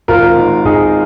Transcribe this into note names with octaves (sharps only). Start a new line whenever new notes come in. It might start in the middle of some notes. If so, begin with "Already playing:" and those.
G#1 F4 A#4
G#2 D#3
G#1 D#4 G#4